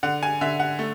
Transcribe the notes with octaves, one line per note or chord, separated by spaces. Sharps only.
D3 F#5
G#5
D3 E5
F#5
A3